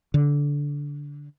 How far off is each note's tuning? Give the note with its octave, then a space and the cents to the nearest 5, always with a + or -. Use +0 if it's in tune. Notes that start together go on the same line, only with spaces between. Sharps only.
D3 -20